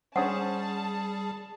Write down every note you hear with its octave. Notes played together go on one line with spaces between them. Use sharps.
G3 C#4 G#4 C5 F#5 A5 D#6